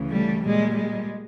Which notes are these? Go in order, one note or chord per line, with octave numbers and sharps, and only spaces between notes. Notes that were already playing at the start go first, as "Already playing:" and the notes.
Already playing: D2 C#3 E3
G3 A3
A#2 G3 G#3
G#3